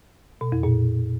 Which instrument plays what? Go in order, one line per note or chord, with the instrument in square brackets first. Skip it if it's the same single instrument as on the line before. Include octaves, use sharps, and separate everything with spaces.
[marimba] B2
F2
A#2